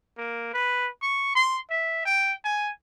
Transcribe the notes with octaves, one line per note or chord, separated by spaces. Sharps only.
A#3
B4
C#6
C6
E5
G5
G#5